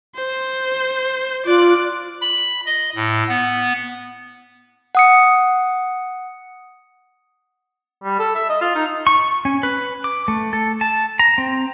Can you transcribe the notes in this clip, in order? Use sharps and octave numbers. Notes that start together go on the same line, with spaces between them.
C5
F4 D5 F#6
B5
D#5
A2
B3
F#5 D#6 C#7
G3
A4
E5
D#5
F4
D#4
C#6
C#4
B4
D6
A3
A4
A5
A#5
C4